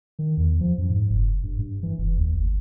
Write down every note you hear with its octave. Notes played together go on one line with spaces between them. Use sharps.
D#3
E2
F3
F#2
G#2
F#1
G2
G2
E3
F1
D#2
G1